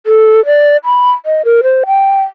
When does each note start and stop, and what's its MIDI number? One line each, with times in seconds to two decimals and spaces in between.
0.06 0.44 69
0.46 0.77 74
0.85 1.11 83
1.26 1.42 75
1.45 1.61 70
1.63 1.84 72
1.86 2.21 79